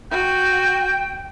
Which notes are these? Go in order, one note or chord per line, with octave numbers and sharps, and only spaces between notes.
F#4 G5 G6